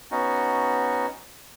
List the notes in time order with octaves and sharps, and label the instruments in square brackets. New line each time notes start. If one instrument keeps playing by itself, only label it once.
[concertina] B3 C#4 D#4 F#4